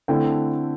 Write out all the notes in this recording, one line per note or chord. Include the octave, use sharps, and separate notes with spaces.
D3 A3 C4 E4 G5